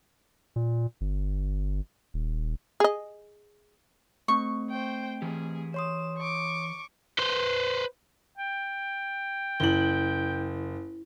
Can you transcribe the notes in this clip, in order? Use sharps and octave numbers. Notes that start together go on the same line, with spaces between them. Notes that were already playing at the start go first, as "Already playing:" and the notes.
A#2
G1
D#1
G#4 D#5
A3 C4 C#6
C5 G5
E3 G4 G#4
C#5 C6 D#6 E7
C#6 D6
B4 C5
G5
F#1 E4 F#7 G7